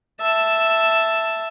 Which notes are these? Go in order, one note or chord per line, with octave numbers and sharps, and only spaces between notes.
E5 A5